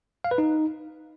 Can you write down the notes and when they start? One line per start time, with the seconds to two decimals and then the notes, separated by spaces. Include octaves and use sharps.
0.24 F5
0.31 B4
0.38 D#4